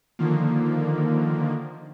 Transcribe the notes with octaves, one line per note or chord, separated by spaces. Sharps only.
D3 D#3 F3 A#3